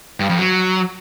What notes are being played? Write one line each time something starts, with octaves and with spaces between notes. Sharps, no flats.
G2
F2
F#3